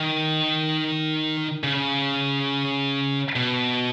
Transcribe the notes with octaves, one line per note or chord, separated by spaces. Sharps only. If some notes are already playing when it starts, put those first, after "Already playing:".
Already playing: D#3
C#3
B2